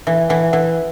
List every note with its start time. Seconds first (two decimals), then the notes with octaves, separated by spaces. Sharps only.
0.07 E3 E5
0.29 E3 F#5
0.43 E5
0.53 E3 F#5